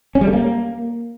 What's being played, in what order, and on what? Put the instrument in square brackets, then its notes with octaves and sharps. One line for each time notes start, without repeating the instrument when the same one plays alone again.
[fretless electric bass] C#4
G3
A3
A#3